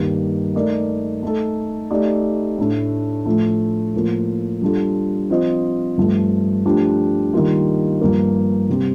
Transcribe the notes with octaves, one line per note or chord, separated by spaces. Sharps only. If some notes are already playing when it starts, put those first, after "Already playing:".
Already playing: G2 D#3 G3 A#3
A3 D#4 A#4 D5
A3 D#4 A4
A3 D#4 G4 D5
A2 A3 D4
A2 F3 A3
A2 F3 A#3
G3 D4 F4 A4
F3 C4 F4 C5 D#5
G2 F3 A3
F3 A3 D4 G4
D#3 G3 A#3 F4
G2 F3 A#3
C3 G3 C4 G4